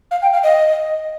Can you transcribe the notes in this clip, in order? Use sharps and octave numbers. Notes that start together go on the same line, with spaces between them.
F5
G5
F5
D#5